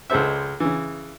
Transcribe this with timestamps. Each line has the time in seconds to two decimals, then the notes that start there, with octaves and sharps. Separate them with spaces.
0.10 C#2 G#3 A4 C5 E5
0.60 C#3 E3